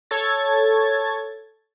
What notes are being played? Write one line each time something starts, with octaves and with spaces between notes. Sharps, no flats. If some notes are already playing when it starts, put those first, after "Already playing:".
A4 C#5 G#6 A6